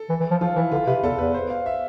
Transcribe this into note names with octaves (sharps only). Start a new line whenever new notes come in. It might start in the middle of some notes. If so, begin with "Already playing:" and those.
Already playing: A4
E3
E3
F3
F3 F4
E3 E4
D3 F4
C3 B4
E2 A4
E2 B4
C5
F5
E5